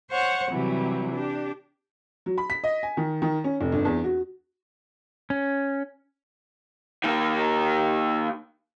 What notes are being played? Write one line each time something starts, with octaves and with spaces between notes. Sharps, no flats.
C5 C#5 F#5 C#6
C3 E3 F#3 G3
D4 G4
F#3
B5
B6
D#5
G#5
D#3
D#3
C#4
F1
G1
E2
F#4
C#4
D#3 A#3